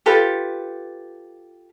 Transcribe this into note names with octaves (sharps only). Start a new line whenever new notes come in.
F4 G4 A4 B4